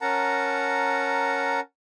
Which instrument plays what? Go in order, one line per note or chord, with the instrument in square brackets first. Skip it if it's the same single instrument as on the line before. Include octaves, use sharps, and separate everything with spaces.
[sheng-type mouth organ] C#4 A#4 F#5 A5 A#5